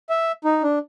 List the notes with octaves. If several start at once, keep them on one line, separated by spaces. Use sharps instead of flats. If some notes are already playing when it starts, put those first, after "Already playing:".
E5
D#4
D4